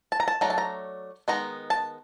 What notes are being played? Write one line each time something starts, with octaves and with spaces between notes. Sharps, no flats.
A5
A#5
A5
F#3 A3 D4 A#5
A5
A#5
D#3 G#3 B3 D#4 A#5
A5